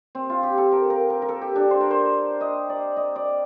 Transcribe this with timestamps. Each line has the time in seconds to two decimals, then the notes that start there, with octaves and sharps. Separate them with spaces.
0.15 C4
0.30 F4
0.43 G4
0.58 A4
0.72 A#4
0.90 A#4
1.10 A#4
1.22 A#4
1.29 A4
1.41 G4
1.56 D4
1.71 C5
1.81 A#4
1.91 C5
2.41 D#5
2.69 D5
2.97 D#5
3.16 D5